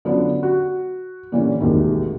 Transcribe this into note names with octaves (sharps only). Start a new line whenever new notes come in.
D3 F#3 B3 C#4 D4 F4
F#4
A#2 D3 E3 G3 C#4
E1 A1 D#2 C3 D#3